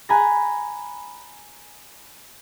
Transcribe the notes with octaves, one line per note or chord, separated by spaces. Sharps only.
G#5 A#5 B5 F#6 A#6